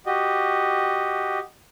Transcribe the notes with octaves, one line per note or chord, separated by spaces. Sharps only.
F#4 G4 D#5